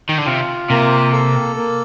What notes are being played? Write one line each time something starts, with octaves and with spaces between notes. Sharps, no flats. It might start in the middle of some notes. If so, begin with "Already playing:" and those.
D#3
D3
C3 F4
C3 A#3
A4
A#3